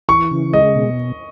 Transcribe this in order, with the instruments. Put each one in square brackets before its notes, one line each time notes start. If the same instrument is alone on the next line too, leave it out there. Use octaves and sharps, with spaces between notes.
[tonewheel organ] E3 [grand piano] C#6
[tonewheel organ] C#3
[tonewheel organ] G#3 [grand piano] D#5
[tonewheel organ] B2